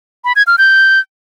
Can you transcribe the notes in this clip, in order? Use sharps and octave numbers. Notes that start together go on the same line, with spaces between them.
B5
G#6
F6
G6